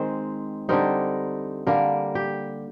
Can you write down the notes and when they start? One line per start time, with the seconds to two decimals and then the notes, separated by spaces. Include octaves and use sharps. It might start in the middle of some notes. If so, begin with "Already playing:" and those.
Already playing: D#3 G#3 C4 C5
0.69 D3 G3 C4 D#4 A#4
1.67 D3 G3 A#3 A#4
2.15 G4